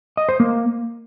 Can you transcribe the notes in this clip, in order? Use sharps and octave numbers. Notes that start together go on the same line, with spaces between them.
D#5
C5
A#3